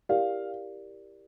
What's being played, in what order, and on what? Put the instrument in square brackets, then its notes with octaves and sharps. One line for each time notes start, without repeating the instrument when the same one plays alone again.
[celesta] E4 G4 A#4 D5 [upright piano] F5